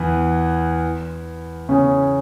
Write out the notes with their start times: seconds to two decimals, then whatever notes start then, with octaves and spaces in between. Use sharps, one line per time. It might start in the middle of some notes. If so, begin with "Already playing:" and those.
Already playing: E2 E3
1.69 C#3 C#4